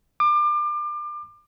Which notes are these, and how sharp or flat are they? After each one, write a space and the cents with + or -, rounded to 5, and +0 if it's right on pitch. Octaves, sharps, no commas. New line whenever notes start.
D6 +30